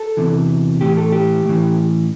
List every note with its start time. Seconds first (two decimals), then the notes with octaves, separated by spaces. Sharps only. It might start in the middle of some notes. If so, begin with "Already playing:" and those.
Already playing: A4
0.17 E2 C3 E3
0.81 A2 E3 G4
0.97 A4
1.12 G4
1.45 A2 E3